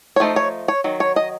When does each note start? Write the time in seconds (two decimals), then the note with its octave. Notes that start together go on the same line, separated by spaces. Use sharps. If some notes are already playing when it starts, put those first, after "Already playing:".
0.16 C#5
0.20 F3 A3 D#4 C5
0.36 C#5
0.68 C#5
0.84 D#3 F#3
1.00 C#5
1.16 D#5